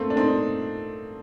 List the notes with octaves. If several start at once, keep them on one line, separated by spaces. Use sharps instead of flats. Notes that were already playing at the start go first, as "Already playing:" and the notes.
Already playing: A3 A#3 C4
D4
C4 D#4